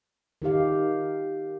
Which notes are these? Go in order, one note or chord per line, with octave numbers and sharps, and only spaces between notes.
D#3 D#4 G4 F5